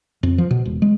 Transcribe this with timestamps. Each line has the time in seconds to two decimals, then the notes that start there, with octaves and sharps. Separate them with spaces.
0.23 F2
0.38 F3
0.51 B2
0.65 E1
0.82 G#3